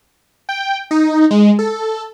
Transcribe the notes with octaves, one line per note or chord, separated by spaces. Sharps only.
G5
D#4
G#3
A4